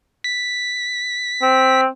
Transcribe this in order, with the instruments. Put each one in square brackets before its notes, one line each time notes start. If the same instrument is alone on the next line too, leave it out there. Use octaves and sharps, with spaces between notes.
[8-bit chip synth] B6
[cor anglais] C4